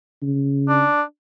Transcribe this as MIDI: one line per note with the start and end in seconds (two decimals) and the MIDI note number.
0.22 0.85 49
0.69 1.02 62